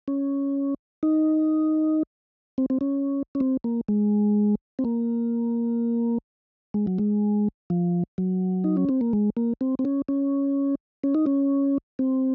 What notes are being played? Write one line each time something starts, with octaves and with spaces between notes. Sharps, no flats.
C#4
D#4
C4
C4
C#4
C#4
C4
A#3
G#3
C4
A#3
G#3
F#3
G#3
F3
F#3
D#4
C#4
C4
A#3
G#3
A#3
C4
C4
C#4
C#4
C#4
D#4
C#4
C4